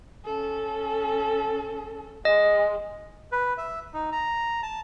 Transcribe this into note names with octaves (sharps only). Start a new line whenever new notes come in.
C#4 A4
G#3 D#5
B4
E5
D#4
A#5
A5